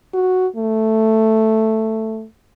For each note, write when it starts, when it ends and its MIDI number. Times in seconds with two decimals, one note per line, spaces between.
0.14 0.47 66
0.56 2.26 57